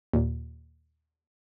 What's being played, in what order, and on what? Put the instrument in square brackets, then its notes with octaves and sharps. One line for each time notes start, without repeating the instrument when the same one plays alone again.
[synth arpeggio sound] D#2 A#2